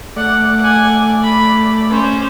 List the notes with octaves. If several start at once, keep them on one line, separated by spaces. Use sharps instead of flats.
A3 D5 F#5
F#5 G#5
B5
C#4 C5